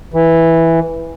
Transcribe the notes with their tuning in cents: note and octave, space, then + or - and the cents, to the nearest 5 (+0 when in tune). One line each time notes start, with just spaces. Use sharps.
E3 -5